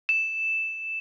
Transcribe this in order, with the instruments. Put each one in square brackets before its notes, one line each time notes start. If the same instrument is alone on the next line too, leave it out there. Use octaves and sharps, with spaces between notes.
[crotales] E7